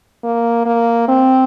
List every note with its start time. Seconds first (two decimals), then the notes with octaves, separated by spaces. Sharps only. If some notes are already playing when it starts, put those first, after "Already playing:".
0.24 A#3
0.66 A#3
1.08 C4